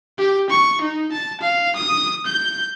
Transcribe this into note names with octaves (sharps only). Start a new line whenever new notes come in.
G4
C#6
D#4
A5
F5
D#6
G6